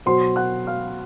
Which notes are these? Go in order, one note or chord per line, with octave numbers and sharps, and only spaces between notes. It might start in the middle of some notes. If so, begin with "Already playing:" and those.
B2 F#3 C5 C6
F#5 F#6
F5 F6